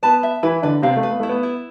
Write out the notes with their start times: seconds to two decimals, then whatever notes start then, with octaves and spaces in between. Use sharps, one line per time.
0.03 B3 B4 A5
0.23 E5
0.43 E3 E4 B4
0.62 D3 D4 B4
0.82 C3 C4 F5
0.96 A3
1.03 B4
1.10 B3
1.20 A3 E4
1.29 B3
1.43 E4